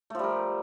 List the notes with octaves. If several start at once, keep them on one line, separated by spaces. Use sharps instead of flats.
F3 G3 A3 A#4